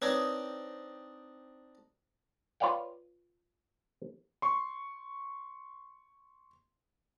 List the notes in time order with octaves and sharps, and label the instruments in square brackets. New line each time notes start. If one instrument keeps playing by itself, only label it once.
[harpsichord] C4 D4 D#4 [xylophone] B4 C#5 D#6
[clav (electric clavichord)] F4 B4 C#5 D5 F5 G5
[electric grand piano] C6 C#6